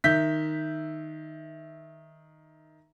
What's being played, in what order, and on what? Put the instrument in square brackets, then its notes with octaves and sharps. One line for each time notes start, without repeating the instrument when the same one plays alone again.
[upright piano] D#3 E5 G6 B6